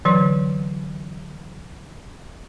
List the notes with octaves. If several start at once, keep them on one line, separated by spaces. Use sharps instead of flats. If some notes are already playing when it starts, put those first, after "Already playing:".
D3 E3 F#3 C#5